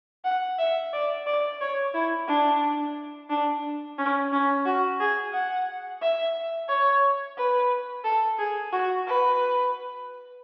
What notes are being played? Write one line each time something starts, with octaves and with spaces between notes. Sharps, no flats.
F#5
E5
D5
D5
C#5
E4
D4
D4
C#4
C#4
F#4
G#4
F#5
E5
C#5
B4
A4
G#4
F#4
B4